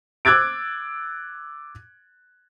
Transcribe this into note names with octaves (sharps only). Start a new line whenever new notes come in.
D6 E6 F#6 G#6 A6 D7